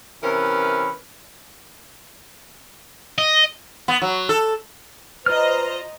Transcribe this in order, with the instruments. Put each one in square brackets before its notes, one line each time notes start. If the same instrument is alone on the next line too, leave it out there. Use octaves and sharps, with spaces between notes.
[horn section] C3 E3 C#4 A#4 B4
[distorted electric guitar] D#5
[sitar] B3
F#3
A4
[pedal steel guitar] F4 D5 F6 [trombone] B4 [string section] C5 D#5 A#5